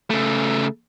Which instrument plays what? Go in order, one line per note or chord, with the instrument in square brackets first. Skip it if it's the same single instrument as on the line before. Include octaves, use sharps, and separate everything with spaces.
[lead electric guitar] C#3 A3